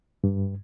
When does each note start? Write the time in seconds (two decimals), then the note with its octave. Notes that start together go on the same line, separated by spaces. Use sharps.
0.24 G2